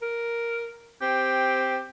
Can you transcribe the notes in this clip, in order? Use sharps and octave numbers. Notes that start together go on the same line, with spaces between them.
A#4
C4 G4